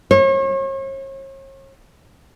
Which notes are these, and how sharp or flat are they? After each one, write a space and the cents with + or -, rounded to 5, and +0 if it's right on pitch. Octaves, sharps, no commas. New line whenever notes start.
C#5 -40